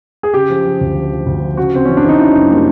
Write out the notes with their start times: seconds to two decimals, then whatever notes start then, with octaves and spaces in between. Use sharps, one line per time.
0.23 G#4
0.34 C#3 G4
0.50 F3
0.65 F3
0.81 D2
0.95 F3
1.11 F3
1.26 D2
1.42 F3
1.57 C#3 F#4
1.73 C#3 C4
1.85 E3 C#4
1.97 D4
2.04 E3 D#4
2.19 C#3 E4
2.35 F#2
2.50 G3 A#3